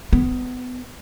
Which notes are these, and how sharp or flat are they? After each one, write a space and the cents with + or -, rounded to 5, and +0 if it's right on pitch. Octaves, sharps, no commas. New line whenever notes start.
B3 +25